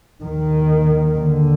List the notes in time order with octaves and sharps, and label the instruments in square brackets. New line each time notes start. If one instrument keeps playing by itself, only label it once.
[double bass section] D#2 D#3
D3